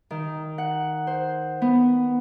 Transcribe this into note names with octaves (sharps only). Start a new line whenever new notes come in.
D#3
F#5
C5
B3